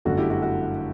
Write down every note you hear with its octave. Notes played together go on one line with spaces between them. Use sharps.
G1 F#2 D3 A3 F#4 A4
E4 G4
F#4
F#4